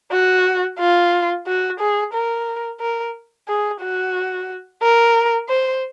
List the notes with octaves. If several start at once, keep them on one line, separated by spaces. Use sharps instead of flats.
F#4
F4
F#4
G#4
A#4
A#4
G#4
F#4
A#4
C5